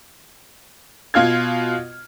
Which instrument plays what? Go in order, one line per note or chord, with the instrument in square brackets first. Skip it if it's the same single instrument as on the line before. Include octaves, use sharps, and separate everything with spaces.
[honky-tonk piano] B2 F4 F5 F6 G#6